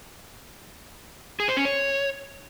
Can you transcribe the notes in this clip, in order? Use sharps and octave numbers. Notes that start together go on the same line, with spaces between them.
G#4
C5
C#4
C#5